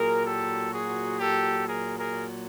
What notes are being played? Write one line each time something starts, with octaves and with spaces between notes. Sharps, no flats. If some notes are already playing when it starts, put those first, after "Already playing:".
Already playing: A#2 F#3 G#4 A#4
G4 A4
F#4 G#4
G4 A4
G#4 A#4
G#4 A#4